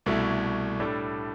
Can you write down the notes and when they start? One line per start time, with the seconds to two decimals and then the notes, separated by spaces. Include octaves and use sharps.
0.06 C2 B2 A3 E4
0.80 A2 G3 D4 A4